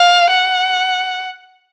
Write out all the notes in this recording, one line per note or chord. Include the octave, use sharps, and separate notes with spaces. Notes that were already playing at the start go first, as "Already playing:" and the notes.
Already playing: F5
F#5